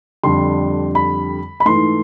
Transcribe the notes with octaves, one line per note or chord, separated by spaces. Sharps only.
F2 D3 G3 C6
B5
B5
G#2 E3 A3 C6